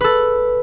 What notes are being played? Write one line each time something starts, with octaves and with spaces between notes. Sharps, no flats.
A4 B4